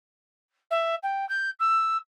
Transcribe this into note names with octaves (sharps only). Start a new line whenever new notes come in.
E5
G5
G6
E6